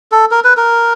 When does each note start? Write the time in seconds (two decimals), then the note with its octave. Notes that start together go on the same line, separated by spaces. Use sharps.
0.12 A4
0.31 A#4
0.44 B4
0.57 A#4